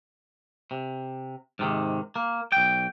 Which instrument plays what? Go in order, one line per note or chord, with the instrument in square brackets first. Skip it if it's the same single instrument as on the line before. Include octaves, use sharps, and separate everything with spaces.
[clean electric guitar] C3
G#2 C3 D#3
A#3
B1 G5